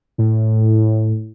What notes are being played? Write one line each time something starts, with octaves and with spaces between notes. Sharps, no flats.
A2